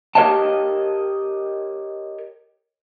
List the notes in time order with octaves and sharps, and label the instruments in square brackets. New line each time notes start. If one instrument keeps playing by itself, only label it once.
[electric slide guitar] G4 A#4 C#5 D#5 G5 A5